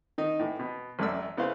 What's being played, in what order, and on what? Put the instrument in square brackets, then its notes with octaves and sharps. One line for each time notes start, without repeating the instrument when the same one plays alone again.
[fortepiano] D#3 D#4
A2 E3
B2
A1 F#2 A3 D5 E6
C#3 B3 E4 B4 C5 F5